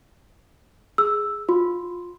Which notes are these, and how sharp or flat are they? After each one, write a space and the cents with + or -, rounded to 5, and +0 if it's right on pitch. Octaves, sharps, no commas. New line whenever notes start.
G#4 +0 E6 +0
F4 +15 C6 +0